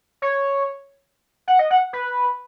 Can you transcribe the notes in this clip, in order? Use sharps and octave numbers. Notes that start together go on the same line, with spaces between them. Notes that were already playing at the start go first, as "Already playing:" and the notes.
C#5
F#5
D#5
F#5
B4